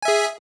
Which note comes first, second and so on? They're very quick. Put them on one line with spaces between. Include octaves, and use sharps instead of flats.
G#5 E5 G#4